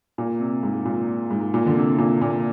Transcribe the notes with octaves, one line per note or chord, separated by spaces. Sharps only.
A#2
C3
G#2
A#2
G#2
A#2
D3
C3
C3
A#2
A#2